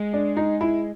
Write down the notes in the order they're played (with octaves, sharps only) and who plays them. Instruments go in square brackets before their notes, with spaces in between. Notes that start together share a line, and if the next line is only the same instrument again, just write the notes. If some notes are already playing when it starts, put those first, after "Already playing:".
Already playing: [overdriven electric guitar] G#3
[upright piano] D4
D#4
E4